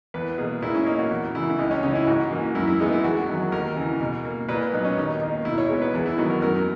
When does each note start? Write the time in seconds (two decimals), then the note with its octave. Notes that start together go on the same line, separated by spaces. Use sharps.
0.14 E2 B4
0.38 B2 A#3 G#4
0.62 A#2 E4
0.75 C#4
0.86 A#3 D#4
0.99 F#4
1.11 E2
1.35 C#3 E3 E4
1.50 E4
1.59 C#2 D#4
1.71 C#4
1.83 C#3 E3 D#4
1.95 E4
2.07 G#2 F#4
2.31 E3 A#3
2.55 F#2 E4
2.67 E4
2.80 E3 G#3 B3 D#4
2.92 E4
3.04 E2 F#4
3.28 D#3 F#3
3.52 D#2 A#4
3.76 C#3 E3
4.01 B2
4.25 A#3
4.49 A#2 B4
4.61 B4
4.73 F#3 B3 D#4
4.85 C#4
4.97 D#2 D#4
5.21 D#3 A#3 D#4
5.45 B2 E4
5.58 C#5
5.69 G#3 B3
5.82 B4
5.94 E2
6.06 E4
6.18 D#3 F#3 B3 F#4
6.30 A#4
6.42 F#2 A#4